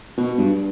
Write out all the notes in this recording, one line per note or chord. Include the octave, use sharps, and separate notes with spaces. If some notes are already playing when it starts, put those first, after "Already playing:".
B2
G2